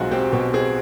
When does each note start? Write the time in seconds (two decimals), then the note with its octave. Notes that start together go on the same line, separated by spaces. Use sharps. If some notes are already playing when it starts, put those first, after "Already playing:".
Already playing: B1 G#3 C4 F4 F#4
0.11 C4 G4
0.32 B2 G4
0.54 C4 G#4